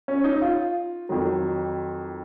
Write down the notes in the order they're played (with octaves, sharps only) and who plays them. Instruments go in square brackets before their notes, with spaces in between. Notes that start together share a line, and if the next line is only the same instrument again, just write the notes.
[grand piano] C#4
D#4
F4
F2 D#3 F#3